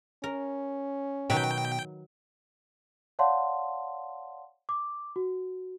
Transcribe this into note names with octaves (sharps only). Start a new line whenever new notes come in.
C#4 A#4
B2 D#3 F#3 B4 G5
C#5 D5 F5 F#5 A5 C6
D6
F#4